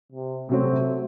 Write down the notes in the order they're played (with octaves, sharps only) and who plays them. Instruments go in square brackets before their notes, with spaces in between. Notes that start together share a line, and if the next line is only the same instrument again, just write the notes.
[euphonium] C3
[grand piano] C3 F#3 C4 [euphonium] A3